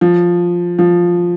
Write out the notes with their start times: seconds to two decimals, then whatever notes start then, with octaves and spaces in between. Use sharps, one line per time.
0.01 F3
0.79 F3